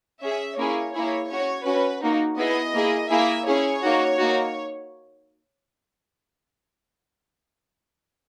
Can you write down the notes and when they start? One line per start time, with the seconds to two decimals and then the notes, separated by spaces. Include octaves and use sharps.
0.22 C#4 G#4 E5
0.57 A#3 C#4 E4 G#4 C#5
0.93 A#3 E4 G#4 C#5
1.30 C#4 F#4 C#5
1.66 C#4 F#4 B4
2.02 A#3 D#4 F#4
2.38 B3 E4 G#4 D#5
2.74 A#3 E4 G#4
3.10 A#3 E4 G#4 E5
3.46 C#4 E4 G#4 C#5
3.83 A#3 D#4 F#4
4.19 A#3 D#4 F#4